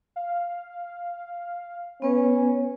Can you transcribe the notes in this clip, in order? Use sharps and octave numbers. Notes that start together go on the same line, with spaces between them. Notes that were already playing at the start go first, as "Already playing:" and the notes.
F5
B3 C#4 B4 C#5